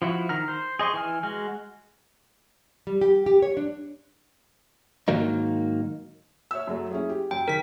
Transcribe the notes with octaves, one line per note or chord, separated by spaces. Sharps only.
F3 E4 F#4
D#3 A#5 F6
C5
G#4 D#5 C6 C#6
E3 G#5 F6
G#3 F#4 F6
G3
G4
G4
C#5
D4
G#2 D#3 F#3 A#3 D#4
C#5 E5 E6
F#2 F#3 A3
C#4 E4 G#4
G4
F#2 G5
D#3 A#4 B6